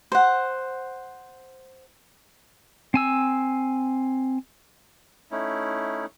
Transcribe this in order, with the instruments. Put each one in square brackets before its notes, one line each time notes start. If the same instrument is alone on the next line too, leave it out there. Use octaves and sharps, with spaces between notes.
[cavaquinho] C5 F#5
[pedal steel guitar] C4 G#5 E6
[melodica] A3 C#4 D#4 E4